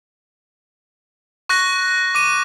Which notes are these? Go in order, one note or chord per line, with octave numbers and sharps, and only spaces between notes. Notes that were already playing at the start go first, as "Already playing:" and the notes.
C#6 F#6 A#6
D6 D#7